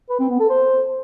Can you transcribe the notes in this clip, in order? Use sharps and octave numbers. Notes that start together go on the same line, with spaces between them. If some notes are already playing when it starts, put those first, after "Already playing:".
B4
C4
B3
A4
C5